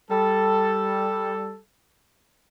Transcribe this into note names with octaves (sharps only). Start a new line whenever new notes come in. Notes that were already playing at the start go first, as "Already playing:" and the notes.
G3 A4